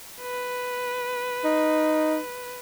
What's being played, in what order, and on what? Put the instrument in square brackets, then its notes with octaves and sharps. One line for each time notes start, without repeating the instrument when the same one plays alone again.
[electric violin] B4
[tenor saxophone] D#4